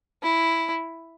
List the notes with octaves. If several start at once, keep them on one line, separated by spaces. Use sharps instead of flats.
E4